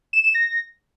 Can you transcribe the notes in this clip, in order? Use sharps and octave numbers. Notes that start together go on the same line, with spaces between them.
E7
E7
A#6